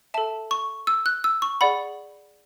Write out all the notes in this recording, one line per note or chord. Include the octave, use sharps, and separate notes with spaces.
A4 E5 A5
C#6
E6
F#6
E6
C#6
G#4 D5 F#5 B5